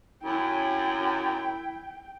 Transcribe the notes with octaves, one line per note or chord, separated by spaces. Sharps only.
F#2 E4 G5